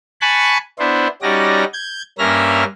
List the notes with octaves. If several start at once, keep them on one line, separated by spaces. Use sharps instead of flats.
G#5 A5 B5 C#6 F#6
B3 D4 E4 C5
G3 C#4 D#4 F#4 D5 A#6
G6 G#6
G2 A#3 C#4 E5 F6 A#6